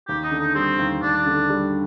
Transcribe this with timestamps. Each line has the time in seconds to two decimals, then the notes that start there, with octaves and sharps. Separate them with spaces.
0.08 D#2 G4
0.24 D#4
0.31 D3
0.39 D#4
0.55 G3 C4
0.78 D#2
1.02 D#2 D4
1.26 D3
1.49 G3